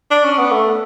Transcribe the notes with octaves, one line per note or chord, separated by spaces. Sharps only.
D4
C#4
B3
A3